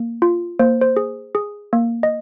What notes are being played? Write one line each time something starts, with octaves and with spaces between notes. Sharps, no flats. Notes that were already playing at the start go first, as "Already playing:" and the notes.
Already playing: A#3
F4
A#3 C5
C5
G#4
G#4
A#3
D#5